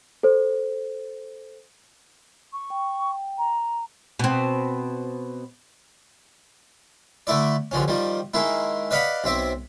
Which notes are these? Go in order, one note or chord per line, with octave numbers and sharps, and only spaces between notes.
A4 C5
C#6
G5
A#5
B2 C4
D3 A3 E4 D5
A1 D3 F3 C#4
D#3 F3 G3
D#3 G#3 A#3 E4
B4 D5 D#5 F5 F#5 B5
B1 C4 E5 D6